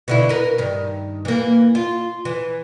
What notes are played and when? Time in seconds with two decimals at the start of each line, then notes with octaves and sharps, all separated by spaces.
0.08 B2 D3 E4
0.29 A#4 B4
0.58 G2 D#3
1.25 E3 A#3
1.75 F4
2.25 E3